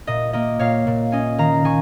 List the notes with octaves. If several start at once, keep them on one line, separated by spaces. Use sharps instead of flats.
A#2 D#5
A#3 D#5
A#2 C#5 F5
A#2
C#4 D#5 G#5
D#3 F5 A#5
D#3 G#5 C#6